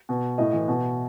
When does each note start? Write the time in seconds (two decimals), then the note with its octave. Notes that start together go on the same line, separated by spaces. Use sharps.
0.09 B2
0.38 A2 D#5
0.53 E3
0.68 B2